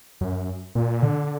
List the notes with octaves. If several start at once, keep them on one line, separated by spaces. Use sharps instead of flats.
F#2
A#2
D3